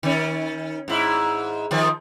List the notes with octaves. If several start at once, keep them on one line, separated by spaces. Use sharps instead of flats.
D#3 C#4
G#2 E4
D#3 F3